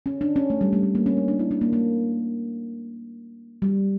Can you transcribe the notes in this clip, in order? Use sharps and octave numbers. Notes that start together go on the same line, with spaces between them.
C#4
D4
C#4
A3
G3
A3
A3
A#3
C#4
D4
D4
E4
D4
A#3
A#3
G3